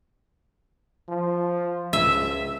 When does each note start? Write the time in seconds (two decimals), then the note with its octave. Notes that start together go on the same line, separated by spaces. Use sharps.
1.09 F3
1.93 C#2 E5